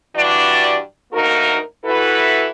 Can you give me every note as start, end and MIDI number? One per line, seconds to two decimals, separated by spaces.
0.16 0.79 43
0.16 0.79 52
0.16 0.79 55
0.16 0.79 62
0.16 0.79 66
0.16 0.79 74
1.13 1.57 38
1.13 1.57 58
1.13 1.57 63
1.13 1.57 66
1.13 1.57 70
1.85 2.48 52
1.85 2.48 64
1.85 2.48 66
1.85 2.48 69
1.85 2.48 71